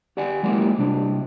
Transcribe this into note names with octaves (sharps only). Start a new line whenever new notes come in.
G4 D5 F#5 G#5
F#3 G#3 A#3 F4 G4
C3 G3 D4